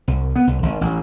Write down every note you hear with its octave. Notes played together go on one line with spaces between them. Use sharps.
C2
B3
C2
G#1
A1